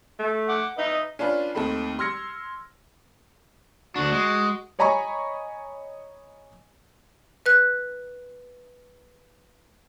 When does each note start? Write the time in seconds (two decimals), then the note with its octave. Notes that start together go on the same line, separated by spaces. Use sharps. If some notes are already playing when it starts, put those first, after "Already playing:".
0.19 A3
0.49 F#5 D6
0.78 D#4 B4 D#5 E5
1.19 C#4 D4 F4 B4
1.55 D#2 D#3 A3 C4 B5
1.99 C6 E6 F6 G#6 A#6 C#7
3.96 D2 D4 F#4
4.12 G#3
4.79 C#5 D#5 G#5 A#5 B5 C#6
7.46 B4 F#6